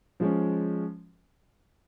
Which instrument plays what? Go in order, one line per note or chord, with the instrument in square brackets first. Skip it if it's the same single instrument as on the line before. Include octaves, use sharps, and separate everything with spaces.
[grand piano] F3 G#3 C#4